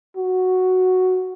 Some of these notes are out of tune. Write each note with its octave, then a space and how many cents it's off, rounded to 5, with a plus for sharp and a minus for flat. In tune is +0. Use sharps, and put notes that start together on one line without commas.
F#4 +0